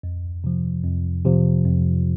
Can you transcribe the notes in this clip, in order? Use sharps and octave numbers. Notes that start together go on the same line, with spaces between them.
F2
C3 F3
F2
C3 F3
F2